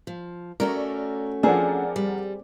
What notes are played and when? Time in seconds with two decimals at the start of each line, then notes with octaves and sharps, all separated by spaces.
0.07 F3
0.60 A3 C#4 F#4 A#4 D5
1.43 F3 C4 D4 G#4 A#4 D5 F#5
1.96 G3